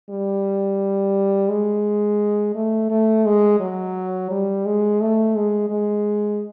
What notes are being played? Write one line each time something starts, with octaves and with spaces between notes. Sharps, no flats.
G3
G#3
A3
A3
G#3
F#3
G3
G#3
A3
G#3
G#3